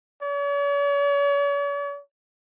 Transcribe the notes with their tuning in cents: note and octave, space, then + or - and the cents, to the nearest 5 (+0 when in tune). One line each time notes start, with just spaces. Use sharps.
C#5 +45